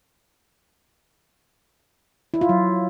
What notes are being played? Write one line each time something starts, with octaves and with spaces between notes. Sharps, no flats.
E4
F4
F#3